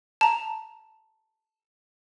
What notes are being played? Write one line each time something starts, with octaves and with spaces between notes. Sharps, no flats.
A5 A#5